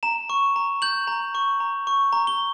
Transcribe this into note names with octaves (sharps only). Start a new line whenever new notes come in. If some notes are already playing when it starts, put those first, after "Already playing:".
A#5 E7
C#6
A#5
G6 F#7
A#5
C#6
A#5
C#6
A#5
G7